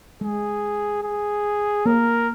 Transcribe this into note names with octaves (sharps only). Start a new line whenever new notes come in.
G#3 G#4
G#4
A#3 A#4